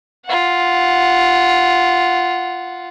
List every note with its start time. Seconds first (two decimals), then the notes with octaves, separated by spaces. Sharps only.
0.25 F4 F#5